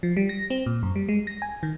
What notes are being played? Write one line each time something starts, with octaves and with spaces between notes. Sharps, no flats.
F3
G3
A#6
C4
A#2
F#2
G3
G#3
A#6
G#5
D#3